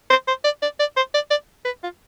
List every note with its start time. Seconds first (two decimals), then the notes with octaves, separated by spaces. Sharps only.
0.10 C5
0.28 C5
0.44 D5
0.62 D5
0.79 D5
0.97 C5
1.14 D5
1.30 D5
1.65 B4
1.83 F4